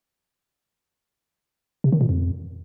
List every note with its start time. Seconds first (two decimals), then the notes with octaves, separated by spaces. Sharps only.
1.84 C3
1.92 D#3
2.01 A#2
2.09 F2